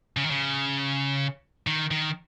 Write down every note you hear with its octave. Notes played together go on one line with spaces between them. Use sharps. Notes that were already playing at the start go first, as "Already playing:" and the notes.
C#3
D#3
C#3
D#3
D#3